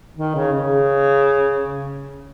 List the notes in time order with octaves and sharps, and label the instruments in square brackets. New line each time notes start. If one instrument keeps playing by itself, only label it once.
[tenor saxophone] D#3
C#3
C#3